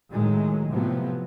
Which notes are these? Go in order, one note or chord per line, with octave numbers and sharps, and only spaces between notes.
A2 D#3 F#3 G#3
A2 C3 F3 F#3 B3